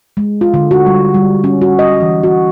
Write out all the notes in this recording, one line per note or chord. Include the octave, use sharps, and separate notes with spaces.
G#3
F4
D3
F#4
G3
G3
C#4
F#4
D#5
E3
F#4